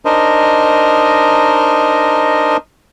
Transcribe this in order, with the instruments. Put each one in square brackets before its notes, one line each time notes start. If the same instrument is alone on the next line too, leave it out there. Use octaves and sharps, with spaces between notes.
[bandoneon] D4 D#4 A#4 C5 D#5